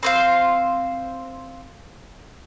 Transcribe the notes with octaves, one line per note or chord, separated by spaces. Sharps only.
C4 C5 F5